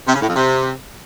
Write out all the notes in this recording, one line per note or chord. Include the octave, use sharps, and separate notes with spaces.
C3
C#3
A2
F2
C3